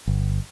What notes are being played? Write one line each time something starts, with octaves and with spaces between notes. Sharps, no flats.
G1